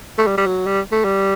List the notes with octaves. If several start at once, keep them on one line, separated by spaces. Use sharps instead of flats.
A3
G3
G3
F#3
G3
A3
G3